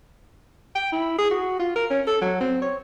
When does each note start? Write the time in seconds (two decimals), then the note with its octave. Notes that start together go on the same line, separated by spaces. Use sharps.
0.75 G5
0.92 E4
1.18 G#4
1.31 F#4
1.60 F4
1.76 A#4
1.90 C#4
2.07 A4
2.21 F#3
2.41 C4
2.62 C#5